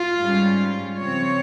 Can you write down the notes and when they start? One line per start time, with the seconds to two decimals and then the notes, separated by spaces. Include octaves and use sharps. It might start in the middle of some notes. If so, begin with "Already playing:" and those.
Already playing: F4
0.18 G#2 G3 C#4
0.98 C#3 F3 C4 C#5